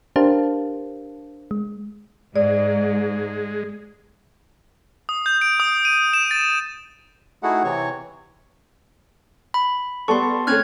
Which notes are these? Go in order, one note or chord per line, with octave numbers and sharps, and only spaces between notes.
D4 G4 A#4 C5 F5 A5
G#3
G#2 G#3 D5
D#6
G6
D7
D#6
D#7
E7
A6
A3 D#4 E4 F#4 G#4 F#5
C3 E3 C4 C#5 C#6
B5
G3 B3 A4 C6 C#6
A3 C4 C#4 F6 F#6 G#6